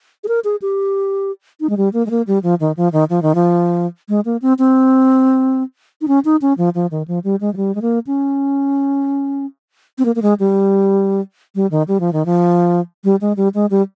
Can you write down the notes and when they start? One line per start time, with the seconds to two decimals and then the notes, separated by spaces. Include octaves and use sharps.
0.24 G#4
0.28 A#4
0.44 G#4
0.62 G4
1.60 D#4
1.70 G#3
1.77 G3
1.93 A#3
2.06 G#3
2.10 A#3
2.27 G3
2.43 F3
2.60 D#3
2.77 F3
2.93 D#3
3.10 F3
3.22 D#3
3.35 F3
4.09 G#3
4.25 A#3
4.42 C4
4.59 C4
6.01 D#4
6.08 C#4
6.25 D#4
6.42 C#4
6.58 F3
6.75 F3
6.91 D#3
7.08 F3
7.24 G3
7.41 G#3
7.54 F3
7.57 G3
7.75 G#3
7.82 A#3
8.07 C#4
9.98 C4
10.05 A#3
10.16 A#3
10.22 G#3
10.40 G3
11.55 G3
11.71 D#3
11.88 G3
12.00 F3
12.13 D#3
12.26 F3
13.04 G3
13.21 G#3
13.37 G3
13.55 G#3
13.70 G3